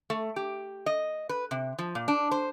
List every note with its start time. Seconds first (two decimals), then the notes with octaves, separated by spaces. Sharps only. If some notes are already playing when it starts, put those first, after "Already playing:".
0.10 A3
0.36 G4
0.86 D#5
1.29 B4
1.51 C3
1.79 F3
1.95 A#2
2.08 D4
2.31 C5